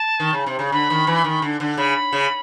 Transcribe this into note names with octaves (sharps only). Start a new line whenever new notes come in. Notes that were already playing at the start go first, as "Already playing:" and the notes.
Already playing: A5
D#3
C#3
C3
C#3
D3 B5
D#3
E3
D#3
D3
D3
C#3 B5
C#3